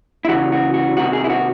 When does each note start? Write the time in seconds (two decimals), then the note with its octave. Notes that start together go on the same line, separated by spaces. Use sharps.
0.25 E4
0.29 C#2 C#3 E3 F#4
0.52 F#4
0.74 F#4
0.96 C2 C3 D#3 F#4
1.13 G#4
1.24 E4
1.30 F#4